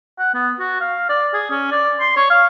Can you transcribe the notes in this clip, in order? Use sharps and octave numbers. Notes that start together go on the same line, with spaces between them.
F#5
B3
F#4
F5
D5
G#4
C#4
D5
C6
C#5
F5